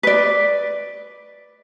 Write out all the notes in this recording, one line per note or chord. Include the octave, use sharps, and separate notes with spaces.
B4 D5